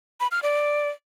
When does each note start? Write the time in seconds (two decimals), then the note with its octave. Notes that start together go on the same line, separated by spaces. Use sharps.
0.20 B5
0.32 F6
0.43 D5